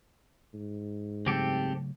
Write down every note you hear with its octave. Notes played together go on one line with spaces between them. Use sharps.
G#2
C#3 F#3 A3 C4 G4 A4